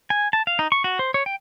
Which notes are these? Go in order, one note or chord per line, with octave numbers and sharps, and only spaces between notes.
G#5
A5
F5
D#4
C#6
F#4
C5
C#5
G5